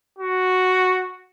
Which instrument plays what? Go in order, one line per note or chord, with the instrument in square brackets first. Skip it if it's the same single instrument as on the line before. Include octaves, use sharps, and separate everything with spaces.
[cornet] F#4